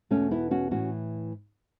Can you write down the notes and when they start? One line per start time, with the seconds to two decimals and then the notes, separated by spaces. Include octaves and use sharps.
0.11 E2 B2 A3 C#4
0.31 B3 E4
0.51 C#4 F#4
0.71 A2 E3 C#4 F#4